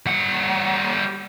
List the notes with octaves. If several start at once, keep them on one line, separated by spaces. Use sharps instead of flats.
G3 F#5